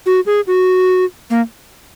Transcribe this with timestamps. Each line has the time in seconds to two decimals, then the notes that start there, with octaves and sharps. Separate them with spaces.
0.06 F#4
0.26 G#4
0.47 F#4
1.30 A#3